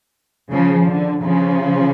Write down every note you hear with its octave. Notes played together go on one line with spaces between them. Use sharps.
C#3 F3
D3
C#3 F3